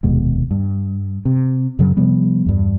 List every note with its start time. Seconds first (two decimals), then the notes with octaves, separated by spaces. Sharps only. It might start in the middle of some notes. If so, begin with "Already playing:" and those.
0.03 F1 D#2 B2 G#3
0.51 G2
1.25 C3
1.79 F#2 C#3 F#3
1.97 C3 F3 G3 B3
2.46 E2 G2